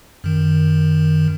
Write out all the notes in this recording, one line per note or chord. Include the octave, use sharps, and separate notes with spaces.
F#2 D#3